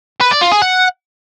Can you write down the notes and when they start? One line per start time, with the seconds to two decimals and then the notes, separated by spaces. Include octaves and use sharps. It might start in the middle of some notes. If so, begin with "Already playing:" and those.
0.21 B4
0.31 D5
0.41 F4
0.52 G#4
0.62 F#5